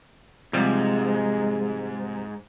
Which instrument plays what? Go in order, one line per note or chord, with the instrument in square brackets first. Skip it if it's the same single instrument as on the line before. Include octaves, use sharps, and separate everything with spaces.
[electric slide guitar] G#2 [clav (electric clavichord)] C3 F3 G3 [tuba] G#3